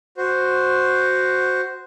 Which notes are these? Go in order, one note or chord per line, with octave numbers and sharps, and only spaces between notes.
F#4 C5